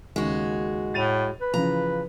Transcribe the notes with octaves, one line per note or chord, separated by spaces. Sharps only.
D#2 C#3 G#3 F#4
A2 A6 D#7 F7
B4
C#3 E3 F3 A#5